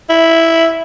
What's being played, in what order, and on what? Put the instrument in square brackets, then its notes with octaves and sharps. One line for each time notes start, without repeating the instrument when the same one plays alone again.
[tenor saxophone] E4